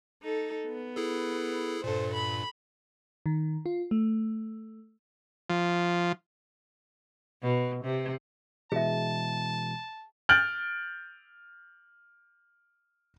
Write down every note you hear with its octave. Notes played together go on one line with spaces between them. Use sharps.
D#4 A4
B3
E4 G#4 A4
G2 A#2 A4 C5
B5
D#3
F4
A3
F3
B2
C3
B2 E3 G#3 G#4 E5 A5
F6 G6 A6 D7 F#7